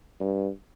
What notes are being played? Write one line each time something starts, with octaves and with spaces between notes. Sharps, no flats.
G2